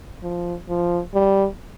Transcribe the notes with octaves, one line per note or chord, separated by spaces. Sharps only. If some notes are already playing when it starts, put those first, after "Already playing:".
F3
F3
G3